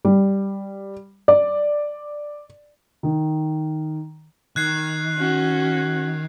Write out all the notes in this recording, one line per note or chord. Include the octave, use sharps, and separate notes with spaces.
G3
D5
D#3
D#3 F#6 G#6 C7
C#4 F#4